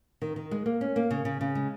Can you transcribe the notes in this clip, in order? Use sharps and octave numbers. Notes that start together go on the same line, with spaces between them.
D#3
D#3
G#3
A#3
C#4
A#3
C#3
C#3
C#3
G#3